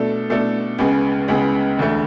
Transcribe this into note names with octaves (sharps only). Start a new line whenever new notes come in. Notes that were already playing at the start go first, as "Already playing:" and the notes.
Already playing: B2 A3 D4 A4
B2 A3 D4 A4
C#2 C#3 G#3 B3
C#2 C#3 G#3 B3
E1 D2 D3 A3